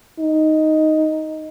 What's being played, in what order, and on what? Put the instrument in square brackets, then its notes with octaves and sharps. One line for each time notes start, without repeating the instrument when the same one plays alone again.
[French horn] D#4